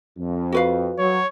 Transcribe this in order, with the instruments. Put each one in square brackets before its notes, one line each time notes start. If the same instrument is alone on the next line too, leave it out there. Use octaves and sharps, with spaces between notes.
[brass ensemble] F2
[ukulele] F#4 B4 F5
[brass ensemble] F#3 [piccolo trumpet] C#5